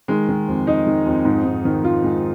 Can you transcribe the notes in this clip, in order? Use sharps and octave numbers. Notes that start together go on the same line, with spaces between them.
D#3 G#3
D#3
F2
D#3 D#4
D#3
F2
G#2
G#2
D#3
D#3 F4
G#2